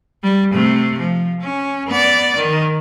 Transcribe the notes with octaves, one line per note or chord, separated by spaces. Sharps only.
G3
C3 A3
F3
C#4
B3 D5
D#3